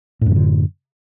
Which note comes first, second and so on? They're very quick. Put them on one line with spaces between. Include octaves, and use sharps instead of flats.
A2 F#2 D#3 D3